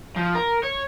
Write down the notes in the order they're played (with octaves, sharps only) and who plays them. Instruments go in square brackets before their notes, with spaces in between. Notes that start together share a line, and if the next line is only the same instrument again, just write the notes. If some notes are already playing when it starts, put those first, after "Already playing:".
[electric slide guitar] F3
A#4
C#5